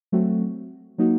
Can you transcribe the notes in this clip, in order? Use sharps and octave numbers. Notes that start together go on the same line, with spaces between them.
F#3 A3 C4 F#4
F#3 A#3 D#4 F#4